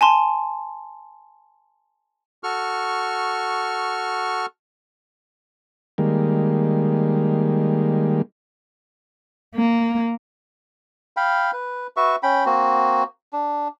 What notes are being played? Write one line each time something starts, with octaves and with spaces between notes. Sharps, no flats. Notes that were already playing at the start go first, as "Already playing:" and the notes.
G#5 A5 C6
F#4 A4 C#6 F6
D#3 G3 G#3 A#3
A#3
F5 G5 B5
B4
F#4 B4 E5 C#6
C#4 G5 B5
A#3 C4 F#4
D4